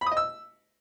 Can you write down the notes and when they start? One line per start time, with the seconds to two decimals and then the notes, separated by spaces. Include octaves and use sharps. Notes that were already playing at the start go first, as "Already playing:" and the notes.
0.01 B5
0.06 D#6
0.12 D#5
0.17 E6